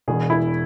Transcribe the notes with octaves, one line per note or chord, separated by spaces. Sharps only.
E1 E2 B2 G#4
E4